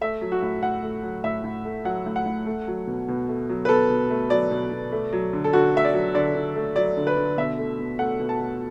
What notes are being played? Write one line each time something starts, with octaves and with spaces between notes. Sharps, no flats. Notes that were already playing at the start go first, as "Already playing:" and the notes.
A3 E5
F#3
F#4
A2
A2 F#5
A3
F#3
A2 E5
A2
A3
F#3 F#5
A2
F#5
A2
A3
F#3
B2
B2
A3
F#3
B4
B2 A4
B2
A3
F#3 D5
B2
B2
A3
F#3
D3
A4
D3 F#4
A3 E5
D5
F#3
D3 D5
D3
A3
F#3 D5
D3
B4
D3
B2 E5
A3
B2
A3 F#5
B2
A5
A3